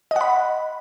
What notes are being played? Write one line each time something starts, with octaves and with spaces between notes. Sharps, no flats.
D#5 F#5 B5